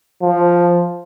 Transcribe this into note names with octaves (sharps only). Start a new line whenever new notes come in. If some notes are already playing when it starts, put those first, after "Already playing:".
F3